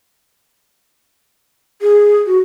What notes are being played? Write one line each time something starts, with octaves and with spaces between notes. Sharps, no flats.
G#4
F#4